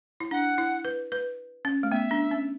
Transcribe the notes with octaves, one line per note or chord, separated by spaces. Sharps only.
E4
D4 F#5
E4
B4
B4
C#4
A3
B3 E5
D4
C#4